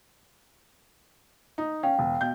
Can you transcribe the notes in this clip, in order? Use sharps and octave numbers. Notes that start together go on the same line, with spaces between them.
D#4
C#4 F5 G5
E1
B2 G6